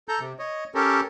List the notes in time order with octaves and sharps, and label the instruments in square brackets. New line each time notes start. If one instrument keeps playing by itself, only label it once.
[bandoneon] A4 A#5 G6
C3
C#5 D#5
C#4 G4 A4 A#4